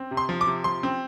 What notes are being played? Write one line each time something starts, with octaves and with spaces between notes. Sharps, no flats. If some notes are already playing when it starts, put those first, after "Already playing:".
Already playing: C4
C3
C6
F3
D6
C3
F3 C6
C4